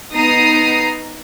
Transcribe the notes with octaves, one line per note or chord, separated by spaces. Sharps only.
B3 D#4 A#5 D#6 C7